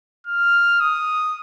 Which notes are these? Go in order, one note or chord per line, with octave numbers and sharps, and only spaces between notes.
F6
D#6